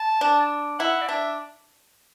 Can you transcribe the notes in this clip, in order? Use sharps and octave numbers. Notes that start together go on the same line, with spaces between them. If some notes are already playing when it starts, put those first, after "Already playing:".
Already playing: A5
D4
E4 F#5
D5
D4 E5